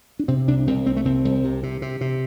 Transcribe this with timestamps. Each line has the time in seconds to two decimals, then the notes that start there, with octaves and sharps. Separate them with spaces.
0.19 D4
0.28 C3 C4
0.48 C2 D4
0.67 C2 C4
0.86 C2 C4
0.97 A3
1.05 C2 C4
1.25 C2
1.44 C3
1.63 C3
1.82 C3
2.01 C3